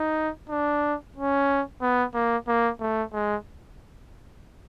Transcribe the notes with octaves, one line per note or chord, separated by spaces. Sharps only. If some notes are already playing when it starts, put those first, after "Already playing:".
Already playing: D#4
D4
C#4
B3
A#3
A#3
A3
G#3